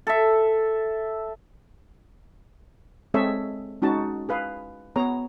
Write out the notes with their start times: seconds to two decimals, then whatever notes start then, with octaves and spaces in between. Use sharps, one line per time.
0.07 A4 E5
3.14 G#3 C4 G#4 A4 C#5 E5
3.82 G#3 C#4 D#4 F#4 A5
4.29 G#4 B4 F5
4.96 B3 G#4 C#5 A#5